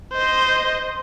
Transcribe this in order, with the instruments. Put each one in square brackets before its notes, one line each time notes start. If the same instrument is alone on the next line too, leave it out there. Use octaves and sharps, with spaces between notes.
[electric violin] C5 D#5